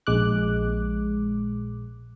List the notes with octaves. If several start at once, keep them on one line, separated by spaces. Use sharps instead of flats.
A#1 G#3 D6 F#6